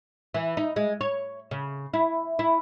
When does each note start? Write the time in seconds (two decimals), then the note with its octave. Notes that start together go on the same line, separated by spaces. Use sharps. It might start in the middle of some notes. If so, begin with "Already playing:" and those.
0.34 E3
0.57 D#4
0.76 G#3
1.01 C#5
1.51 C#3
1.94 E4
2.39 E4